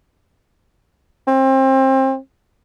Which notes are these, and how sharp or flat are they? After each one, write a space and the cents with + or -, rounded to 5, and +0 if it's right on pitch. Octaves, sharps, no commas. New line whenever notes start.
C4 +30